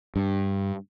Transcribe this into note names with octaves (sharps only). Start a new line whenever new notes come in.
G2